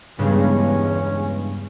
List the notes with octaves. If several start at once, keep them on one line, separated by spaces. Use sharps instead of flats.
E2 G2 C#3 G#3 C#4